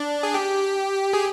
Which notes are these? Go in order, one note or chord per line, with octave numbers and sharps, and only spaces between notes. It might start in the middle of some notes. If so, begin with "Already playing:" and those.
Already playing: D4
G#4
G4
G#4